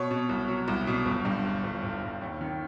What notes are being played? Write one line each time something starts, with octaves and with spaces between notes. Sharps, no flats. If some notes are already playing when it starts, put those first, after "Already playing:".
Already playing: B2 C#5
B2
C2
F#3
C2
B2
G1
G2
G1
G1
G1
G1
D#2
D#3